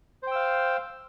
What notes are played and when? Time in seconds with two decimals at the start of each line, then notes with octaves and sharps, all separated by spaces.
0.23 C5
0.27 G5
0.31 E6
0.36 F5